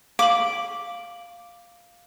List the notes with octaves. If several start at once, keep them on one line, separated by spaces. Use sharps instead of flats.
F5 D6 F#7